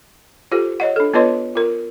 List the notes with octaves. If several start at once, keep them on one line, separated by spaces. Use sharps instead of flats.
F4 G4 A4 C5
C#5 D#5 F#5
D4 A4
B3 F4 B4 C#5 D#5 C6
F4 A#4